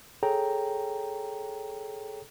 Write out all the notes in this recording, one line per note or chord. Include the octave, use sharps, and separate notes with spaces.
G#4 A4 C#5 G5 A#5